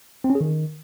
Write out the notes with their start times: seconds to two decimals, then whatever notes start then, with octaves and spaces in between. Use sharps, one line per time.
0.24 C4
0.30 C#4
0.35 G#4
0.41 D#3